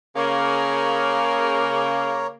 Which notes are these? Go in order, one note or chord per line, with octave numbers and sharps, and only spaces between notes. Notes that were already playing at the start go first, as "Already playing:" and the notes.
C#3 A#3 A#4 C#5